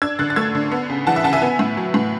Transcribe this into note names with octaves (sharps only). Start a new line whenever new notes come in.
D4 E6 G#6
D3 F#6 A6
A6
A3 E6 G#6
D3
B3
C#3
E3 F#5 A5
E5
C#3 F#5 A5
E5 G#5
B3
A2
F#3
A2